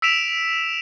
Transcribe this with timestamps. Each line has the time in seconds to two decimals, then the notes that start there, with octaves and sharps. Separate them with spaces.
0.02 E6 B6 D7 E7 F7